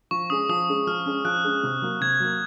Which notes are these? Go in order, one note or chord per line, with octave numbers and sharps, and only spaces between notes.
F3 C#6
G#3 C#4 D#6
F3 D#6
G#3 C#4
F3 F6
G#3 C#4
F3 F#6
G#3 C#4
C3
F#3 A#3
C3 G#6
F#3 A#3